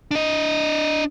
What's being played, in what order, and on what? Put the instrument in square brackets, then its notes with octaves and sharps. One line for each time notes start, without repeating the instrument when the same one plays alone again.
[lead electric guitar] D4 D#5